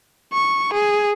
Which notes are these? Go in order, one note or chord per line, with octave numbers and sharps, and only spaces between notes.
C#6
G#4